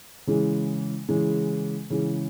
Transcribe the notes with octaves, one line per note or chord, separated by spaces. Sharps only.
C#3 E3 G#3
C#3 E3 G#3
C#3 E3 G#3